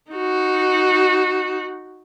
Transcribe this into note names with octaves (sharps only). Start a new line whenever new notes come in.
D#4 F#4